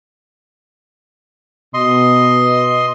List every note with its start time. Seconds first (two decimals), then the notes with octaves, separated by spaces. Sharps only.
1.74 B2 D#5 C6